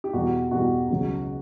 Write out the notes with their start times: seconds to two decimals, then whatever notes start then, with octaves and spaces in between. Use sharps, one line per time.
0.04 G4
0.13 E2 B2 G3 F#4
0.51 E2 B2 G3 F#4
0.90 C#2 C#3 F#3